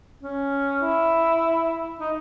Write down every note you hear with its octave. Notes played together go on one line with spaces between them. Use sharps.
C#4
E4
D#4